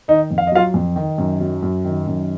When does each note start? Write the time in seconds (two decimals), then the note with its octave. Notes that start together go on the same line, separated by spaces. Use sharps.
0.08 D#3 D#4 D#5
0.31 F2
0.38 F5
0.47 D#5
0.52 F#3 F4 F5
0.74 F2
0.96 D#3
1.18 F#2
1.41 F#3
1.63 F#2
1.85 D#3
2.07 F#2